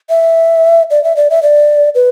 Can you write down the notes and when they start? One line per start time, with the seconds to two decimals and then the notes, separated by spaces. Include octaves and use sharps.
0.10 E5
0.90 D5
1.04 E5
1.16 D5
1.30 E5
1.43 D5
1.95 B4